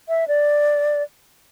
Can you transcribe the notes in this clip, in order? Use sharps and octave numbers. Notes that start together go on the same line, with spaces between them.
E5
D5